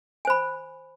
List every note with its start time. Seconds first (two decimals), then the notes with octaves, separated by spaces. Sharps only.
0.25 G#5
0.27 C5
0.30 B5